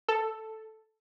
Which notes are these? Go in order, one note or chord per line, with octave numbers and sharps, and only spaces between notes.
A4